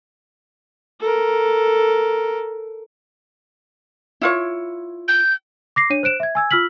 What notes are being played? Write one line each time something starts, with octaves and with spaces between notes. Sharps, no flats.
A4 A#4
E4 F4 C#5
G6
D6 A#6 C7
D4 C#5 D#7
C5 F#6 D7 E7
E5 G#6
G#5 E6 G#6
F4 E6 F6 B6 F#7